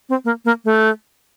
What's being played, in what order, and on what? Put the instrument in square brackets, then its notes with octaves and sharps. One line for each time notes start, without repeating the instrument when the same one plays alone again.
[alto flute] C4
A#3
A#3
A3